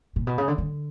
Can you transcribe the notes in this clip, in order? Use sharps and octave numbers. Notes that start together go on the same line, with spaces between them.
A#2
B2
C#3
D3
D3